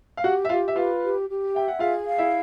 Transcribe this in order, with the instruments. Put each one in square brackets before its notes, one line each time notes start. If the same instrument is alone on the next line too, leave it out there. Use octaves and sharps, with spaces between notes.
[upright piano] F5
[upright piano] F#4 F#5 [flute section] G4
[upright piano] E5
[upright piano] F4 F5 [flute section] G4
[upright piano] E5
[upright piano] F4 F5 [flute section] B4
[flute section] G4
G4
[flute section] E5 [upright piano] G5
[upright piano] F#5
[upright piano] F4 F5 [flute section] G#4
[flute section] F5
[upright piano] E4 E5